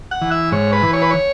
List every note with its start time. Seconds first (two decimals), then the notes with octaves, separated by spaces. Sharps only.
0.11 F#5
0.21 E3
0.31 E5
0.52 G#2 C#5
0.73 B4
0.83 E3
0.93 C#5
1.02 B4
1.11 C#5